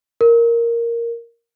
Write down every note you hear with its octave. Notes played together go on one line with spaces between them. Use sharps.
A#4